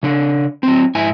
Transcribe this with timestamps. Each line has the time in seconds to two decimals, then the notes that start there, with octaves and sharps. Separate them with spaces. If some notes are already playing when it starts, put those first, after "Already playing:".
0.03 C#3 D4
0.63 F#3 C4
0.95 G#2 E4 G#5